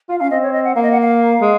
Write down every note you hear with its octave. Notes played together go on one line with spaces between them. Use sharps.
F4 F5
C#4 F5
C4 D#5
C#5
D#5
F#5
A#3 F5
D#5
F#5
F5
G#3